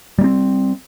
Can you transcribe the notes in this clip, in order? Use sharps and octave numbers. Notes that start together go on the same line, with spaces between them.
G3 A#3 C4